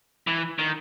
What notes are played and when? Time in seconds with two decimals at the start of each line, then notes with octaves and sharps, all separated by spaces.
0.27 E3
0.59 D#3